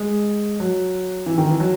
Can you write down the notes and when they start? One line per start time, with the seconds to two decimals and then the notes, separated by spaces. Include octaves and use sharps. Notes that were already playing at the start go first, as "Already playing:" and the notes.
Already playing: G#3
0.60 F#3
1.26 E3
1.38 D#3
1.49 E3
1.60 F#3